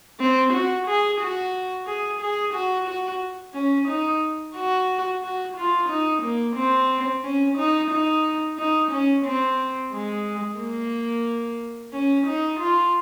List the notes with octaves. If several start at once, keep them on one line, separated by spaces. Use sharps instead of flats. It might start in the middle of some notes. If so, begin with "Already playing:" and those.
C4
F#4
G#4
F#4
G#4
G#4
F#4
F#4
C#4
D#4
F#4
F#4
F4
D#4
A#3
C4
C#4
D#4
D#4
D#4
C#4
C4
G#3
A#3
C#4
D#4
F4